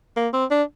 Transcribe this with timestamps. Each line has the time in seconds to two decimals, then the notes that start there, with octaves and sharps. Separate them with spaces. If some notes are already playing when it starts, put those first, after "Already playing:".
0.17 A#3
0.33 C4
0.51 D4